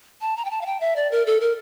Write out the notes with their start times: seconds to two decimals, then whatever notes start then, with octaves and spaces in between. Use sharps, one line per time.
0.21 A5
0.37 A#5
0.45 G5
0.51 A5
0.61 F5
0.66 G5
0.80 E5
0.96 D5
1.12 A#4
1.26 A4
1.41 A#4